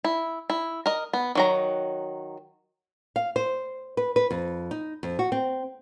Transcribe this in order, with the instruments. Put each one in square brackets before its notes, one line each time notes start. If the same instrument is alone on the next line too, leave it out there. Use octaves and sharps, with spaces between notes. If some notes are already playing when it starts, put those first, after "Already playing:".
[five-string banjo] E4
E4
A#4 D#5
B3
D#3 F#3 A#5
[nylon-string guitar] F5
C5
B4
B4
F2
D#4
F2
F#4
C4